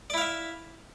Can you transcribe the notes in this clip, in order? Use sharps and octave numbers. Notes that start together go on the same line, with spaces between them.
E4 D5 E5 F5